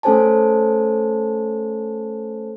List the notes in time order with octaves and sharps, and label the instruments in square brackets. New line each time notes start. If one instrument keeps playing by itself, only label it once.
[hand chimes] A3 C#4 A4 C5 G#5 A5